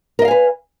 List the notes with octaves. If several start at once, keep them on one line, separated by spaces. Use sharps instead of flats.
A#4 B4 D#5 F5 G#5